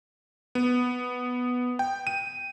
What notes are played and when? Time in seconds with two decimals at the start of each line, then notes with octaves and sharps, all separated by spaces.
0.55 B3
1.79 G5
2.07 D#7